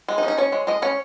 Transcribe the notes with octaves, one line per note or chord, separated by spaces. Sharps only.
G#3
D#4
C#4
D#4
C#4 C#5
G#3
G#3 D#5
C#4 C#5